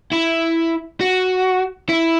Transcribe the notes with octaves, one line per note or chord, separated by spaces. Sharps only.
E4
F#4
E4